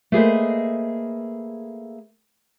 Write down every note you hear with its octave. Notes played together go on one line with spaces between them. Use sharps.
A3 A#3 G#4 B4 C5 D#5